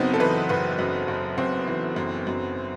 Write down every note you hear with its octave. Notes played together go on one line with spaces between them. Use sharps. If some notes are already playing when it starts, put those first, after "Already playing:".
Already playing: F#1 F#2 B3 C4 D#4
A4
E3 B4
F#1 B4
F#2
F#1
F#1 C4
E3
F#2
F#2